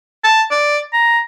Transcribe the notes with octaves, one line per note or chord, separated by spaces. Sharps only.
A5
D5
A#5